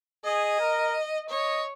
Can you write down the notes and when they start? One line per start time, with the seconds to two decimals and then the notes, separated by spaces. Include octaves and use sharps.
0.25 G#4 D#5
0.60 A#4
1.29 C#5 D#5